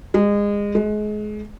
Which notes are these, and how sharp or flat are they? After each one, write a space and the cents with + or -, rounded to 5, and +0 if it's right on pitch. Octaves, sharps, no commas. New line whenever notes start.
G#3 -25
G#3 +30